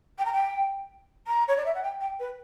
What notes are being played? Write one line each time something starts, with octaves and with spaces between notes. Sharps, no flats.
G5
A#5
G5
A#5
C#5
D5
E5
F#5
G5
G5
B4